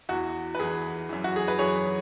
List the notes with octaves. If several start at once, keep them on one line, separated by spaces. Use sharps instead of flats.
E2 E3 F#4
B4
E2 E3 G#4
F#2 E3
F#4
G#4
B4
F#2 E3 G#4 C#5